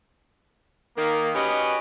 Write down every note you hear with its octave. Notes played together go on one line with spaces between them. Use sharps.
D#3 A#3
C#4 F#4 G4 B4 D#5